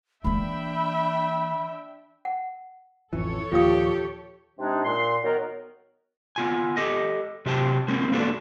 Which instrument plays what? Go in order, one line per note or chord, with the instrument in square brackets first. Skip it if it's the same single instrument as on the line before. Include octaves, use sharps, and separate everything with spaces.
[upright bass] E3 A#3 [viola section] D4 E5 G5 [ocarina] B5
[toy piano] F#5
[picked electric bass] A1 F2 E3 [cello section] A4 C#5
[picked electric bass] D#2 A#2 F3 [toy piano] F4 F5 D#6 [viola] G4
[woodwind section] C3 G#3 D4 D#4
A#2 C6
D#3 F#3 B3 D#4 A#4
[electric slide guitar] B3 F4 G#5
G4 A4 D#5
C3 F#3 G4 C5 G5 A5
G#3 A#3 C4 C#4
A#3 B3 D4 F#4 A4